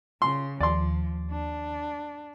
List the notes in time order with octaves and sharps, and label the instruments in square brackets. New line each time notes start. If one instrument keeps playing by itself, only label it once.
[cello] C#3 [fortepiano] C6
[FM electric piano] D#2 [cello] F3 [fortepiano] D5 C6
[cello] D4